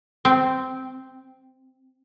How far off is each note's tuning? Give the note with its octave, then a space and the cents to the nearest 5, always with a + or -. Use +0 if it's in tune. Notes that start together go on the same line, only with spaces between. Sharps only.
C4 -10